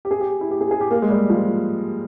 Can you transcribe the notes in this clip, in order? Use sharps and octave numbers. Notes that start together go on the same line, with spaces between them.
G4
G#4
G4
E4
G4
G#4
G#4
G4
A#3
G#3
G3
F3